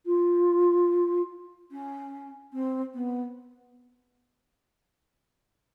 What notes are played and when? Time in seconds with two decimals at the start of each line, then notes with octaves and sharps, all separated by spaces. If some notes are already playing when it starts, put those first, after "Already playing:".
0.06 F4
1.71 C#4
2.53 C4
2.94 B3